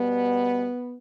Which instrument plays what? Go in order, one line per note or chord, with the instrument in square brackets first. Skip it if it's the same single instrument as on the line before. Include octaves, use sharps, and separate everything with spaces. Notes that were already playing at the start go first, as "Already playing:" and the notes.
Already playing: [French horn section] B2 G3 B3